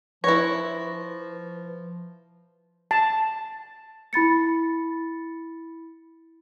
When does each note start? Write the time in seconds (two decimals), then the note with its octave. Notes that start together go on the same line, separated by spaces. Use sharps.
0.24 F3 E4 B4 C#5 A#6
2.91 A5
4.13 E4 B5 A6 C#7